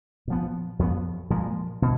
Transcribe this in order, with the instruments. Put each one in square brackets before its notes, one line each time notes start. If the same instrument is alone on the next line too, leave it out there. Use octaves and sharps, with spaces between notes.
[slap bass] A#2 F3 B3
F2 F3 B3
A#2 F3 G#3
B2